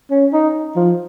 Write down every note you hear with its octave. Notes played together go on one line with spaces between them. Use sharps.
C#4
D#4
F3